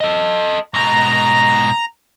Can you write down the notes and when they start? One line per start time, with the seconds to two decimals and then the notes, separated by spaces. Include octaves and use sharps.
0.01 A4 D#5
0.74 G#2 B2 A#5